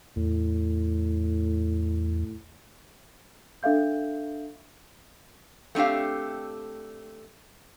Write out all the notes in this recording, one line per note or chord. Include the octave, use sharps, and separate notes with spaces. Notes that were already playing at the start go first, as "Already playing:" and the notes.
E2 A2
D4 A4 E5 F5 G6
A3 C4 D4 G4 F5